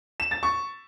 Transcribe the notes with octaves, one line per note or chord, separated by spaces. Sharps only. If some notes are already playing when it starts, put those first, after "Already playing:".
E7
A6
C#6